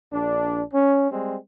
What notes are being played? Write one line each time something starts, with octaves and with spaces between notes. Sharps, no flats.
A#1 D4
C#4
G3 G#3 C4